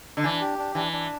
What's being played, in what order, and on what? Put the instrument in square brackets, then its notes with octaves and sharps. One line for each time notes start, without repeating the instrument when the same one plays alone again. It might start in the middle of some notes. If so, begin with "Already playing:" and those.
[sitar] D3
[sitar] E3 [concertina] D4
[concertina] G4
D4
[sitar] E3 [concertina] D4
[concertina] D4